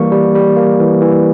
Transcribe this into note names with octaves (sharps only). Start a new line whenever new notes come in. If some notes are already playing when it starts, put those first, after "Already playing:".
Already playing: E3 G3 A#3 C#6
G3
G3
A#3
E3
E3